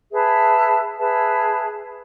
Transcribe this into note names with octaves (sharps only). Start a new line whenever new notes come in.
G#4 B4 E5 A5
G#4 B4 E5 A5